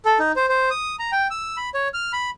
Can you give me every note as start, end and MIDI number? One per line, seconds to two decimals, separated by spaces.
0.05 0.18 69
0.19 0.32 63
0.36 0.46 72
0.49 0.69 72
0.70 0.96 87
0.99 1.11 82
1.12 1.27 79
1.30 1.57 88
1.57 1.70 83
1.74 1.88 73
1.94 2.12 89
2.13 2.30 83